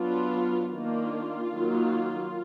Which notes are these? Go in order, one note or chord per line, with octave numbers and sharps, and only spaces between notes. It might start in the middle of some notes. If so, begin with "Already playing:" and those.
Already playing: F#3 B3 D4 F4
D#3 A#3 D4 F4
D#3 F#3 A#3